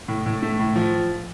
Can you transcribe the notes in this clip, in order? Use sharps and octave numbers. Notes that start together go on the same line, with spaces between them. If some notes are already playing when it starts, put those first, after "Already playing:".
A2
A2
A3
A2
F3